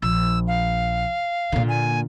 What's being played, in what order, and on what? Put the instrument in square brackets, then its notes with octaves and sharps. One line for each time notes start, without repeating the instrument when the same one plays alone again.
[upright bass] A#1 [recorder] E6
[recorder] F5
[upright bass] A#2 D3
[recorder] G#5